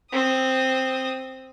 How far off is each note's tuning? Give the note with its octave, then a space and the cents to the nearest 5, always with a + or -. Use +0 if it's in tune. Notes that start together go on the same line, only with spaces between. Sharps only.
C4 +0 D#6 +0